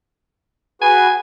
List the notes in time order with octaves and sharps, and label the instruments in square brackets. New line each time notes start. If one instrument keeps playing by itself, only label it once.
[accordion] F#4 G#4 B4 [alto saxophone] G#5